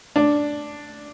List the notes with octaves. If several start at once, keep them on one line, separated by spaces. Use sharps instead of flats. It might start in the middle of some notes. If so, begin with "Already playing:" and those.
D4